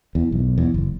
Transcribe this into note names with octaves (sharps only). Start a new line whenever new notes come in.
E2
B1
E2
F#1